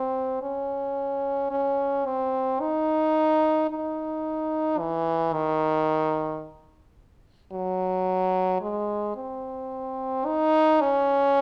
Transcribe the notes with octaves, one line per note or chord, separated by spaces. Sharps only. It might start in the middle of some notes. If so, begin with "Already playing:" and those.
Already playing: C4
C#4
C#4
C4
D#4
D#4
E3
D#3
F#3
G#3
C4
D#4
C#4